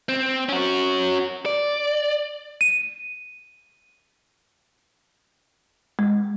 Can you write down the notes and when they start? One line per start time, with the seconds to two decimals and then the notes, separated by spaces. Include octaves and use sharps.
0.09 C4
0.49 C#4 F#4
1.46 D5
2.61 D#7
5.99 G#3